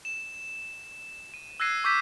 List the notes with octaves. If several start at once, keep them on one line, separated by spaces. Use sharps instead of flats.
E7
D#7
E6 F#6 G#6 A#6 C7 D#7
C#6 D6 E6 G6 B6 D#7